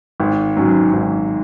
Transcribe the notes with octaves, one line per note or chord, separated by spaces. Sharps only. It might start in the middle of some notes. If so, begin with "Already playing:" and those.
G#1
G#2 F#3 C#4 F#4
G#1